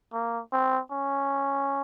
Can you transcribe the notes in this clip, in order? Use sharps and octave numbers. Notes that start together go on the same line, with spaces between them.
A#3
C4
C#4